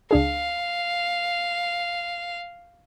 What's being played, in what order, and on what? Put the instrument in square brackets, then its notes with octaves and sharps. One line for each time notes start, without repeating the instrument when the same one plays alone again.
[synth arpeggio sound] C#2 D4 G#4 [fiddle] F5